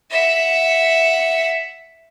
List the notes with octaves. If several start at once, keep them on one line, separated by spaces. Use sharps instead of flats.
E5 F#5